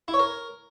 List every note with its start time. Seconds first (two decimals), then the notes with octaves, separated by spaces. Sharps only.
0.08 E4
0.14 C#5
0.19 A#4